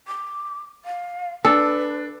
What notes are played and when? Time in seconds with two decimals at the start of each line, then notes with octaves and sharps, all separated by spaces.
0.07 D6
0.85 F5
1.45 D4 A4 B4